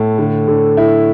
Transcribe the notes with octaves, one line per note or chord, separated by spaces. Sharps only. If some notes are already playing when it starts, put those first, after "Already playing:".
Already playing: A2
D3
D3
E4